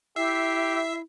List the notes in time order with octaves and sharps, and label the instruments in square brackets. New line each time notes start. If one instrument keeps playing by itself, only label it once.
[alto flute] E4 [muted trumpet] G4 [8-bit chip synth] E5 [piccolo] C7